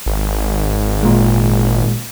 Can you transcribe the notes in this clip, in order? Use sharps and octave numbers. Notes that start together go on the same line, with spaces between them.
G#1
A#2 G#3